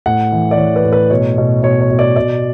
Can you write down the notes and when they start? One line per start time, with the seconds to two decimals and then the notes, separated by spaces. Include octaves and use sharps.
0.06 A2 F#5
0.32 E3
0.51 D5
0.57 E3 C#5
0.76 B4
0.84 A2
0.93 B4
1.10 B2 C#5
1.38 B2
1.63 B2 C#5
1.81 C#5
1.90 B2
1.99 D5
2.16 B2 D5